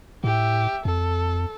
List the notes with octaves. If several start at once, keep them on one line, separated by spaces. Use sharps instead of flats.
A2 G4 E5
F2 A4